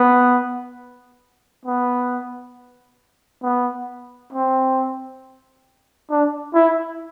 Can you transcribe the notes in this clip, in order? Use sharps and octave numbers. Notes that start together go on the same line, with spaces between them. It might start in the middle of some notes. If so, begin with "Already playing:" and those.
Already playing: B3
B3
B3
C4
D4
E4